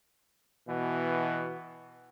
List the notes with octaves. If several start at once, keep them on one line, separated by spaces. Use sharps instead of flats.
B2 E3